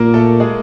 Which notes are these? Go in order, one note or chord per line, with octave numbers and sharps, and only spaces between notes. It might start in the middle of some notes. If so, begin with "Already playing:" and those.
Already playing: A#2 A#3 A#4
A3 A4
G#3 G#4